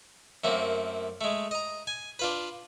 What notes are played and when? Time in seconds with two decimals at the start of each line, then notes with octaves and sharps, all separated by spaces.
0.44 F#2 A3 A#3 C4
1.21 G#3 A3
1.51 D#5 A#5
1.87 G#5
2.19 D4 F4 B4